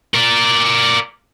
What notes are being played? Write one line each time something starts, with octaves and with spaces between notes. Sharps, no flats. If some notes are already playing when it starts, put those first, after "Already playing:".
A#4 D5